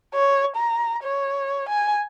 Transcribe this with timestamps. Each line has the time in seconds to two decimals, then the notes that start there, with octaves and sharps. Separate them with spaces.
0.15 C#5
0.56 A#5
1.03 C#5
1.69 G#5